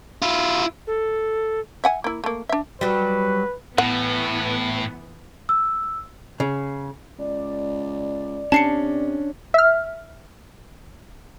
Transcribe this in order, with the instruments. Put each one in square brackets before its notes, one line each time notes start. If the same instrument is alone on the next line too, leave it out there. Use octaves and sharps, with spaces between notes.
[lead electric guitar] E4 F4
[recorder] A4
[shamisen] E5 F#5 G#5
A#3 E4
A3 A#3
D4 E5
[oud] F#3 G3 [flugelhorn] B4
[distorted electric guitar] A2 [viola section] E3 B3 [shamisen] F#5
[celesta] E6
[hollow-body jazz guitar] C#3
[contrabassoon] C#2 [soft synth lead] D5
[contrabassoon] C3 [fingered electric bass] C#4 D4 [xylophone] A5 C7 C#7
[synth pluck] E5 F6